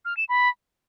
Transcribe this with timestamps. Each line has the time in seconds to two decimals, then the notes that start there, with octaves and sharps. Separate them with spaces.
0.05 F6
0.17 E7
0.29 B5